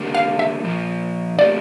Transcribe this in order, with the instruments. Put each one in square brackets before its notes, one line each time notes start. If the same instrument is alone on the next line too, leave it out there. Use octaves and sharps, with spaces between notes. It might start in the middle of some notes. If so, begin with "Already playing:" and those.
Already playing: [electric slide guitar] D3 G3 A#3
[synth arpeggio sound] F5
E5
[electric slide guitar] A#2 F3 A#3
[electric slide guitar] A2 G3 A#3 [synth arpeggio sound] D5